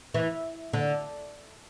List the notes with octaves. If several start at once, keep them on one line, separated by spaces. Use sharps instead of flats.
E3
D3